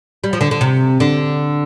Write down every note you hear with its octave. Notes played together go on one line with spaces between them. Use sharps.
G3
F3
D3
D3
C3
D3